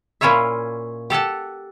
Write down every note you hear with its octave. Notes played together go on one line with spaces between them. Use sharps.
A#2 C#4 E4 F4 C#5 E5
G4 A4 F#5 A5